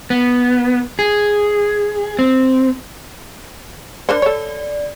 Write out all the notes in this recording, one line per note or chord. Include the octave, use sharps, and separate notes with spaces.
B3
G#4
C4
D4 A#4 C5 D5
A4 C#5